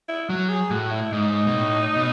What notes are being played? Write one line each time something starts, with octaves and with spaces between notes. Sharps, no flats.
E4
F#3 F#4
G#4
A2 F#4
E4
G#2 D#4
B2
A2
B2